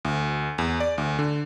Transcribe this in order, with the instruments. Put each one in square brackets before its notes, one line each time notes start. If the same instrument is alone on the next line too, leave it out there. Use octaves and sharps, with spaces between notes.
[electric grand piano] D2
E2
D5
D2
D3